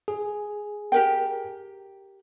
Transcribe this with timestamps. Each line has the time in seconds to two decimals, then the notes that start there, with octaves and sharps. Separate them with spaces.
0.08 G#4
0.92 G4 A#4 G5